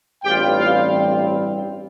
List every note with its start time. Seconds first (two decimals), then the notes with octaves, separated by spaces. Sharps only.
0.24 A1 G2 G3 C4 F4 G4 G5
0.57 F4 F5